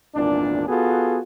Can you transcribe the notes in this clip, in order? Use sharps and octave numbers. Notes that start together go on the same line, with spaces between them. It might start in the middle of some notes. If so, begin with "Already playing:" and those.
G#1 E2 A#2 D4
B3 F4 F#4 G#4 A4